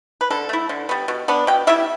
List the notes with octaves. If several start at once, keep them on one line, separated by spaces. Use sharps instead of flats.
B4
D3 A4
A3 E4
D3
G3 B3
B2
B3 D4
B2 G5
G3 E4 E5